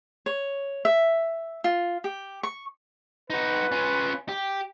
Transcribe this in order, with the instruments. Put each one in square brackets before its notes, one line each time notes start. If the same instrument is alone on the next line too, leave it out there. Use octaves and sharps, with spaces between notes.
[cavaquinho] C#5
E5
F4
G4
C#6
[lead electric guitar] D#4 F#4 [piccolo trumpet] B4
[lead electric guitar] C#4 F4
G4